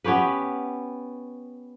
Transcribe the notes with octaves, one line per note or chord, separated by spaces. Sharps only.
B3 C#4 G4 B4